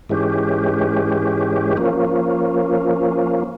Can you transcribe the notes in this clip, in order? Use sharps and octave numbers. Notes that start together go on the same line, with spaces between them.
G#2 E3 G#3 C#4 G4
F3 A#3 C#4